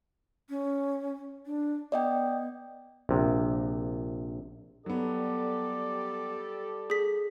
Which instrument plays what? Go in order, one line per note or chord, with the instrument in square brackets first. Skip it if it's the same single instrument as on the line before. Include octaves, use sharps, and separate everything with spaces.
[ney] C#4
D4
[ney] B3 [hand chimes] D5 D#5 G5
[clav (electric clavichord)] A#1 C3
[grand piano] F#3 B3 [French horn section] G3 G4 A4 [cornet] D5
[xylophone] G#4 B6